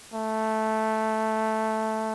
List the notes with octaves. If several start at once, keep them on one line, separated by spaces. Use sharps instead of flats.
A3